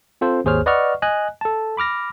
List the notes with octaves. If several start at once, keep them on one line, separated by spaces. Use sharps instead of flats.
C4 F4 A4 C5
G#1 D#2 G#4 C5 C#5 F6
B4 D5 D#5 F#5 C#6 F6
D#5 G#5 F#6
A4 A5
B5 D6 F6 A#6